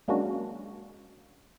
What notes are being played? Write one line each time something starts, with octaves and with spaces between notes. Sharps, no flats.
F#3 G#3 A#3 C#4 D4 F#4